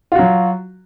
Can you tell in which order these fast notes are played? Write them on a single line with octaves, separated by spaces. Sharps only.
F4 F#4 F#3